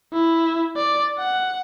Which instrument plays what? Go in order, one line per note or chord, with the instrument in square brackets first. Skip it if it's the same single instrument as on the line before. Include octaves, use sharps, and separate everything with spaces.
[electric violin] E4
D5
F#5